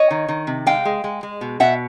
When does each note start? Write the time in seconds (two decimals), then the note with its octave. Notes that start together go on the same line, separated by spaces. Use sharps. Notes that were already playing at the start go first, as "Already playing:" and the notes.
Already playing: C#5 D#5
0.11 D#3
0.29 D#3
0.47 C3
0.66 G#3 F5 G5
0.85 G#3
1.04 G#3
1.23 G#3
1.41 B2
1.60 B2 E5 F#5